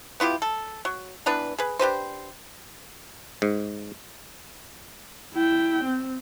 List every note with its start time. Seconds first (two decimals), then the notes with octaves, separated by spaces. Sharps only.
0.20 B3 E4 F4 G4
0.42 A4
0.85 F#3
1.26 E3 B3 D4 B4
1.58 G#4 B4
1.79 D4 G4 B4 C5
3.42 G#2
5.34 E4 G5
5.84 C4